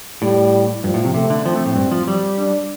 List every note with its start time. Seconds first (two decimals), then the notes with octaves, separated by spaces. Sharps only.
0.22 A2 G3
0.84 G2 F3
0.94 A2
1.04 C3
1.14 C3 A3
1.30 D3
1.45 F3 C4
1.56 A3
1.66 A2
1.76 G2
1.92 F3
2.08 G3
2.38 D4